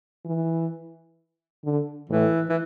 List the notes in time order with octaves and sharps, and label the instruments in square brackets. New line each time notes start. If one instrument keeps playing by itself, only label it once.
[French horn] E3
D3
[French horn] A2 [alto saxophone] E3
[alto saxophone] E3